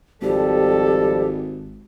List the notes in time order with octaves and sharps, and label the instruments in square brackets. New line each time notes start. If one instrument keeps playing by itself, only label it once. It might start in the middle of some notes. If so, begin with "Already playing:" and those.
[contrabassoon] G#1 [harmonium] F2 F3 G3 [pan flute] G4 [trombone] A4